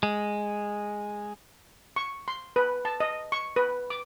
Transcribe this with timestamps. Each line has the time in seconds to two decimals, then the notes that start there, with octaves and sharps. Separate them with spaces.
0.03 G#3
1.96 C#6
2.28 C6
2.56 B4
2.85 A5
3.00 D#5
3.32 C#6
3.56 B4
3.90 D6